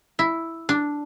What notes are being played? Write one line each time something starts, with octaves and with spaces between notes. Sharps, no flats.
E4
D4